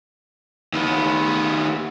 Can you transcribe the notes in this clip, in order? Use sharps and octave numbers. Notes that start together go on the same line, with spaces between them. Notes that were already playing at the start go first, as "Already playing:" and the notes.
D#2 B3